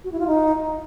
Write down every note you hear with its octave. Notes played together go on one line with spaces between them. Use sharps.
F#4
E4
F4
D#4